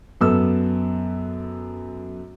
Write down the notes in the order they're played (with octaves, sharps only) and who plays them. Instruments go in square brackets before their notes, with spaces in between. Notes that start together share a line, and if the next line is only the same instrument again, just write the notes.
[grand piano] F#2 B3 A4 E6